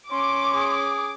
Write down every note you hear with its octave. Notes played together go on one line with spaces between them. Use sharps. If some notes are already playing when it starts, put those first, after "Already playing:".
C#4 C6 D6
G#4